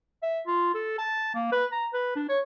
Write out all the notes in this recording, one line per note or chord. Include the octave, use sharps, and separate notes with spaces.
E5
F4
A4
A5
A#3
B4
A#5
B4
D4
C#5